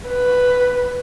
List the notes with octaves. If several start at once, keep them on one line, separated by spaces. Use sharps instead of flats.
B4